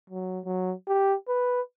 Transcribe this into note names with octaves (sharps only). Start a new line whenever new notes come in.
F#3
F#3
G4
B4